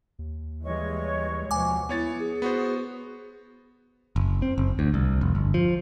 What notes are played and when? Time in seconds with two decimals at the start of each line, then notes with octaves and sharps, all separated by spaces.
0.19 D#2
0.64 E3 G3 G#3 C#5 D#5 C#6
1.51 D#2 B2 F3 F#3 G#5 D6
1.89 B3 E4 C#5 A6
2.19 G#4
2.42 B3 F#4 C5
4.16 F#1
4.42 C4
4.58 F#1
4.79 D2
4.94 C2
5.21 F1
5.35 G1
5.54 F3